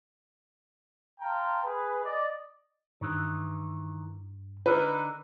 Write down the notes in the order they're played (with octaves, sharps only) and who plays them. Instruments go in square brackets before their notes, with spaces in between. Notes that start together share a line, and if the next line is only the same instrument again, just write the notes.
[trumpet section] F5 G5 A5 A#5 C6
G#4 B4
D5 D#5
[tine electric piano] G2 [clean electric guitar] D#3 E3
[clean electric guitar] D3 D#4 A#4 [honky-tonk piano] B4